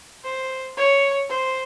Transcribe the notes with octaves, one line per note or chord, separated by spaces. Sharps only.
C5
C#5
C5